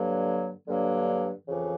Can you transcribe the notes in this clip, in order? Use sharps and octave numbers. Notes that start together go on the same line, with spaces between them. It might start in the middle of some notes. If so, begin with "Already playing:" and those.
Already playing: G2 D3 F#3 A#3
G2 D3 F#3 A#3
F2 C#3 E3